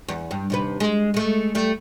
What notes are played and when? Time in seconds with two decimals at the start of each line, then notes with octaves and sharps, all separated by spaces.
0.08 E2
0.31 G2
0.50 D#2 C3 B4
0.80 G#3
1.14 G#3 A3
1.55 G3 A3